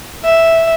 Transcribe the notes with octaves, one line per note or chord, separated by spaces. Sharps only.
E5